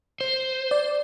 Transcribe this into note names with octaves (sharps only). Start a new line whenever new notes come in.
C5
D5